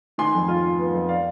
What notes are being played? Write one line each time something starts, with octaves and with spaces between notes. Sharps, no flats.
D#3 G#5 C6
F2
F4
F4
B3
F2
D5 F5